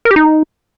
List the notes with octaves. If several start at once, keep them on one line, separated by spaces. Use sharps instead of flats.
A#4
G4
D#4